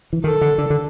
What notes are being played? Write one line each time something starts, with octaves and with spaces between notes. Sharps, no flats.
E3
D#3 A4
D3
D3
D3